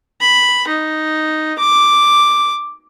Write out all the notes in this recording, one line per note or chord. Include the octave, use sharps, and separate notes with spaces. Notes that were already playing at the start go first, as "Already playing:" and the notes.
B5
D#4
D6